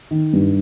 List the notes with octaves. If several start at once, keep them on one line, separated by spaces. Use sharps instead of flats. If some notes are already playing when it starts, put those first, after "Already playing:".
D#3
G2